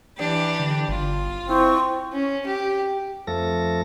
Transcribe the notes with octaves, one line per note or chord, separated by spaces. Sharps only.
E3 D4 G4
D3
G1 F4
C4 E4 C#6
C#4
G4
F2 F3 A3 A4 A#6